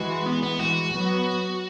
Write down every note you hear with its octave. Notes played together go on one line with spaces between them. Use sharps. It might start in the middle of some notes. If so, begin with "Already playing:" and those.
Already playing: E3 G#3 F#4
B3
B3
E3 G#3 F#4
F#3 B3